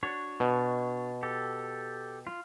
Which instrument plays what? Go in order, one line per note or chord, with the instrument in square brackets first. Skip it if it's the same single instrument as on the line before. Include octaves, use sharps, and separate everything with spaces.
[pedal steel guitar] D4 F#4 C#5
[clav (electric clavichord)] B2
[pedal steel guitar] G4 A4
F4